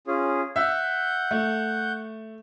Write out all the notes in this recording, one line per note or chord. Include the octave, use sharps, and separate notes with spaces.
C#4 F4 G#4
E5 F#5 G6
A3